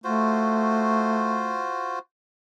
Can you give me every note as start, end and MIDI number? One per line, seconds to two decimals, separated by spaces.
0.04 1.68 57
0.04 1.99 65
0.04 1.99 66
0.04 1.99 72